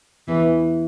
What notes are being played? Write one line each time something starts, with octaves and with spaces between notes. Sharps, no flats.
E2 E3